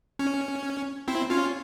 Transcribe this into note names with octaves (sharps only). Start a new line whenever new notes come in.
C#4
C4 E4
C#4 F4